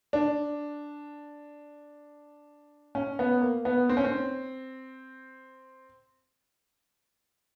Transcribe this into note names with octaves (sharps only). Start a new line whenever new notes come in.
D4
C#4
B3
A#3
B3
C4
C#4
C4